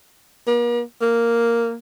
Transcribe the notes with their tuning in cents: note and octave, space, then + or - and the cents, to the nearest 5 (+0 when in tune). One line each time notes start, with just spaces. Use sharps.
A#3 +45
A#3 -5